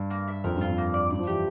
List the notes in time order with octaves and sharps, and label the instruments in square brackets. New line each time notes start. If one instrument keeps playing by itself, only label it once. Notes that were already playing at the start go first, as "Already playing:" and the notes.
Already playing: [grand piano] G2
[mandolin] A#3
E5
[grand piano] F2 [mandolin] A#4
[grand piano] G2
[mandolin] F4
[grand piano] F2
[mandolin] A#3
D5
[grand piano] G2 [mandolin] D5
[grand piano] F3
[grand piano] E3 [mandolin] G4